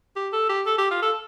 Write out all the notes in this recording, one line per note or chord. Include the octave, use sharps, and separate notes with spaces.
G4
A4
G4
A4
G4
F4
A4